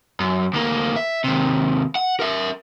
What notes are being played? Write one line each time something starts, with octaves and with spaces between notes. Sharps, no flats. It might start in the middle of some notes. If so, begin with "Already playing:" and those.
F#2
D2 A#3
E5
D#2 C3
F#5
A#4 E5